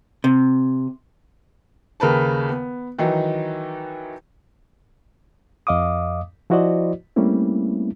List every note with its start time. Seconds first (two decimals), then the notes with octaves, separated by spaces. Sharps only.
0.24 C3
2.00 D#2 C#3 A#4 B4 A5
2.49 B3
2.99 D#3 E3 F#3 D#4
5.67 F2 D#5 F5 D6 D#6
6.50 F3 E4 F#4 C5 D5 D#5
7.16 G3 A3 A#3 C4 C#4 E4